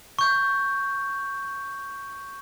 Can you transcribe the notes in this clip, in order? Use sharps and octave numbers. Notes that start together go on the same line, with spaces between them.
C#6 G6